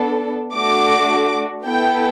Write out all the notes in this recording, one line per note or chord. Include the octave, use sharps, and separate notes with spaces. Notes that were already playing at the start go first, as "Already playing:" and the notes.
Already playing: B3 D4 A4
A3 D4 F#4 D6
B3 E4 A4 G5